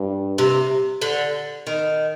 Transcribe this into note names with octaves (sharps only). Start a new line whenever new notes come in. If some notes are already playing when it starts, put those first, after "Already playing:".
Already playing: G2
C3
D3
D#3